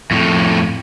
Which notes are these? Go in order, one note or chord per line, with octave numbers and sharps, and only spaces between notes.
F2 A2